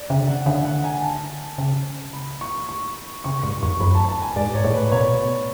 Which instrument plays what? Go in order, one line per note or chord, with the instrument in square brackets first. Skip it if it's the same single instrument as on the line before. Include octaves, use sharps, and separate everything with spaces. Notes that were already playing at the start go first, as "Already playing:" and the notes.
Already playing: [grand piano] D5
[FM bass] C#3 [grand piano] E5
[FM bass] D3
[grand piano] F#5
[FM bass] D3 [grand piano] E5
[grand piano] F#5
G#5
A5
[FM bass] C#3
[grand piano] B5
C#6
C#6
[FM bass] C#3 [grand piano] C#6
[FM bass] G#2 [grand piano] C#6
[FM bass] E2 [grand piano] C#6
[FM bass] F#2 [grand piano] B5
[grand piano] A5
A5
G#5
[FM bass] G#2 [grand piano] D5
[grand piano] C#5
[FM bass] A2
[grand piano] B4
[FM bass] B2 [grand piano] C#5